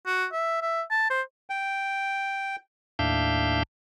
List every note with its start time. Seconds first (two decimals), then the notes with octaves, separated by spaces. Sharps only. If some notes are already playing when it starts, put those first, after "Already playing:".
0.06 F#4
0.32 E5
0.61 E5
0.91 A5
1.10 C5
1.50 G5
2.99 D#2 A2 D4 E5 F5 G6